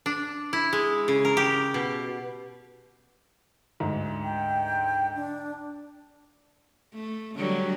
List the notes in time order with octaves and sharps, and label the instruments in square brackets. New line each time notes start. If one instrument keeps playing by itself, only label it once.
[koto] D4
E4
G#3
C#3
A#4
G4
B2
[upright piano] D2 G#2
[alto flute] G5
D4
[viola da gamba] A3
D3 F#3 G3